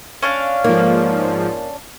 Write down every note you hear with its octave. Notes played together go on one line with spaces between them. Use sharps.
C#4 D4 F5
G#2 F3 A#3